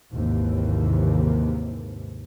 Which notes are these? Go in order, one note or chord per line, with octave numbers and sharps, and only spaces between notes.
G#1 D#2 G#2 C3 E3